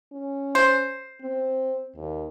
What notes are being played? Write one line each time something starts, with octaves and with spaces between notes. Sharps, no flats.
C#4
C5
C4
D#2